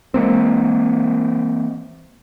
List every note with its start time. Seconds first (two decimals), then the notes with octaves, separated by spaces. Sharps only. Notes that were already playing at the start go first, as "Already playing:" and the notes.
0.14 E3 G#3 A#3 C4